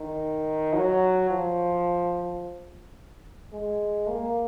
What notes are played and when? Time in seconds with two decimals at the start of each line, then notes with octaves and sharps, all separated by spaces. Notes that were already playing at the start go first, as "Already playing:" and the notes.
Already playing: D#3
0.73 F#3
1.30 F3
3.53 G#3
4.09 A#3